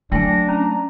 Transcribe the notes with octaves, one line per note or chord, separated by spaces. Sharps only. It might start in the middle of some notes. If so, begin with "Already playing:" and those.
F#3 A3 D4 G5 G#5 A#6
C#4 A#5